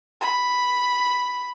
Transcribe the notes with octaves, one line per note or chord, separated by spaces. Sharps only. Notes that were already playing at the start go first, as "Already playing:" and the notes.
B5